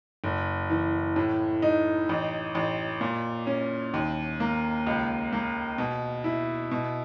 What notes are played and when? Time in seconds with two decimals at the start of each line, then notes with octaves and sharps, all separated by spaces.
0.24 F#1
0.70 E3
1.16 A2
1.62 D#4
2.09 A1
2.55 A1
3.01 A#2
3.47 C#4
3.94 D#2
4.40 A#3
4.87 C#2
5.32 A#3
5.78 B2
6.24 E4
6.71 B2